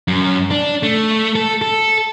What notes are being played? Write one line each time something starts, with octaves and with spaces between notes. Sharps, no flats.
F#2
D4
A3
A4
A4